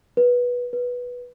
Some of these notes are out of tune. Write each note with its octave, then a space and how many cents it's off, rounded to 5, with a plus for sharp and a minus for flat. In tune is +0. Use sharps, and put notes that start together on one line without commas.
B4 -15
B4 -10